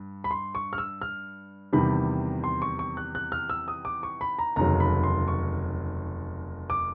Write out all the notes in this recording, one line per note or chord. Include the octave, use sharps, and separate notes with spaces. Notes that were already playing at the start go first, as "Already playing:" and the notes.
Already playing: G2
B5
C6
C#6
F6
E6
F6
E2 C3 D#3 G3 B5
C6
C#6
C#6
F#6
F#6
F6
E6
D#6
D6
C#6
B5
A#5
F1 D#2 C#3 F#3 A#5
B5
C6
C#6
D6